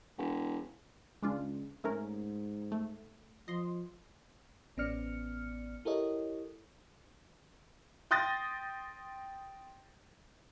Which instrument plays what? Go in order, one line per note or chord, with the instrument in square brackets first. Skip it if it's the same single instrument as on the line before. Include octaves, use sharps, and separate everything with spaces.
[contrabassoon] E1
[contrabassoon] C#2 [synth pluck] G#3 D4 F4
[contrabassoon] G#2 [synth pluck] A3 C#4 A#4
[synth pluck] A3
[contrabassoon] F3 [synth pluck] D#5 C6
[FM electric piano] A1 B3 C#4 D5 F6 C#7
E4 G4 A4 A#4 C#5 D#5
[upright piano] G5 C6 D#6 G6 A6 A#6